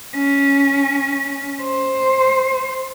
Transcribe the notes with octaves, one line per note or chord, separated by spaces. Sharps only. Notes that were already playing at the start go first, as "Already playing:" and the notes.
C#4
C5